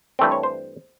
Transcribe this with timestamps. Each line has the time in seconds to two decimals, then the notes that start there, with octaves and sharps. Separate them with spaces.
0.19 G2 E3 A3 C4 G5
0.32 C#5
0.43 C5